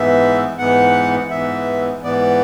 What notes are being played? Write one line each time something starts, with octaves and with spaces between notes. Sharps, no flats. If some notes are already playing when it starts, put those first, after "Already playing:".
Already playing: G#2 E3 B3 E5
G#2 E3 B3 F#5
G#2 E3 B3 E5
G#2 E3 B3 D5